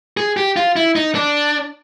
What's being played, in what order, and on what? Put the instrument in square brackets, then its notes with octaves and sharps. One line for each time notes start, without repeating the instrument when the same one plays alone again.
[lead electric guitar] G#4
G4
F4
E4
D#4
D4